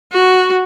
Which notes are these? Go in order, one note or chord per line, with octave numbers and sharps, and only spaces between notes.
F#4